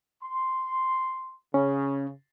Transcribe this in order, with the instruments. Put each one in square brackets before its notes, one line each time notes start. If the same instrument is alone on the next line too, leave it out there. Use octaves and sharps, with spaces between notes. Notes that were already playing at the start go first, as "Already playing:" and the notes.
[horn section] C6
[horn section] C#3 [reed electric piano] C#4